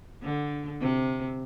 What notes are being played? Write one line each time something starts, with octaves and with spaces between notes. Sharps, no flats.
D3
C3